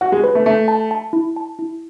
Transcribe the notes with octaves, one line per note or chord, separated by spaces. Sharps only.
F#4 F#5
G#3
B4
A3
A3 A5
A5
A5
E4
A5
E4